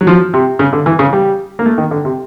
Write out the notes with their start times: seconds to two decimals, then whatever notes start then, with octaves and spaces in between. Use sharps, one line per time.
0.01 F#3
0.07 F3
0.34 C3
0.59 C#3
0.73 D3
0.86 E3
0.99 C#3
1.13 G3
1.59 A#3
1.66 A3
1.78 D#3
1.91 D3
2.05 C3